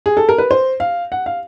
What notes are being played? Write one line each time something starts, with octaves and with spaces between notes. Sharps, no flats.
G#4
A4
A#4
B4
C5
F5
F#5
F5